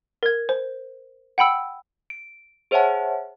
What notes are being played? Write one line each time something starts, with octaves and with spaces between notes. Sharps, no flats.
A#4 G#6
C5
F#5 G5 B5 E6
D7
G#4 C5 C#5 E5 F#5 A5